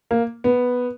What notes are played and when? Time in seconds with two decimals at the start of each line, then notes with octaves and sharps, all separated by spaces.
0.11 A#3
0.44 B3